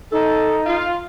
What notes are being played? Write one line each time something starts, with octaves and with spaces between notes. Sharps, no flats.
D#4 A4
F4